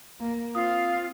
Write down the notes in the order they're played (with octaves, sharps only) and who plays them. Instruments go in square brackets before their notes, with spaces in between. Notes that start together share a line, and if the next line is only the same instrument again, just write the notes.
[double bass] A#3
[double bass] C4 [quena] F4 [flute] F5 [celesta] D#6